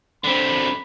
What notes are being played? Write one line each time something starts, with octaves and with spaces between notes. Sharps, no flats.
D3 C4 B5